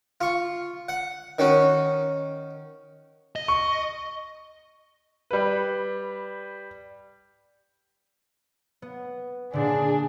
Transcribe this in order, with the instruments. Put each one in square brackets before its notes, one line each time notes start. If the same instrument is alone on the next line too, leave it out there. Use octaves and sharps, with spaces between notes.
[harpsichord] F4 C#6
F#5
D#3 C#4 F#4
[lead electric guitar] D#5
[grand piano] C#6
[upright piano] G3 B4
[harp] B3
[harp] A#2 D3 [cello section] D4 [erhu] G#4